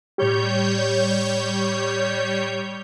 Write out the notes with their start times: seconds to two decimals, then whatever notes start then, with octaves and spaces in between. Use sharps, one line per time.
0.18 A2 G3 G4 C#5 G6